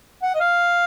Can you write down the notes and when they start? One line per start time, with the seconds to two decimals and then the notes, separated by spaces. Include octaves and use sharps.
0.22 F#5
0.34 D#5
0.40 F5